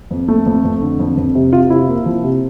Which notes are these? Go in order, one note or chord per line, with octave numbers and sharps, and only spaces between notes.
F2
A3
F2
F2
D3
F2
F2
C3
C3 F4
C3 E4
A#3
F3
C3